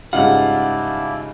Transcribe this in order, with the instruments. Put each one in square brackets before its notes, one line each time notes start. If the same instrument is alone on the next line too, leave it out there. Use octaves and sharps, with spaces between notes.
[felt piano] G#2 C#3 G3 [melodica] E4 D5 A5 [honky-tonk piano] F4 [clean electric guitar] F#5